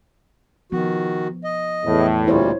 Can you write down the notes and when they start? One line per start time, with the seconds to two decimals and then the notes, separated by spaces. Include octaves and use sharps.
0.72 D#3 F3 B3 F#4
1.44 D#5
1.84 E2 A2
2.27 D2 A#2 G3 E4 C5 C#5